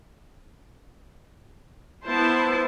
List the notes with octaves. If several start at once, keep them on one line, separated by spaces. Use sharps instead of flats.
B3 E4 C5 A5